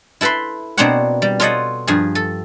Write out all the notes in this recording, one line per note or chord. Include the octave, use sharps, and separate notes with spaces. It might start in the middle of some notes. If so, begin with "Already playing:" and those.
E4 A4 B4 B5 C6
B2 A#3 C4 D4 C#5 F#5
G3
F4 A4 C#5 D#5 F5 F#5
G2 F3 G#4
A4